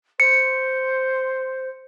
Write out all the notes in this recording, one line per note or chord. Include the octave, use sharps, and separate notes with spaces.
C5 C#7